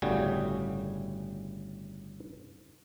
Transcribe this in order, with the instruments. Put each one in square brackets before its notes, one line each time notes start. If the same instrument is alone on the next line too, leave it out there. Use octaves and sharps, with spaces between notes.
[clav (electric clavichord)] G1 A2 C#3 G3 F#4 G#4